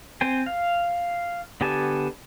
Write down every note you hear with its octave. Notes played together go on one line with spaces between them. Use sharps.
C4 C5 G5 G#5
F5
D3 B3 G4 G#5 A5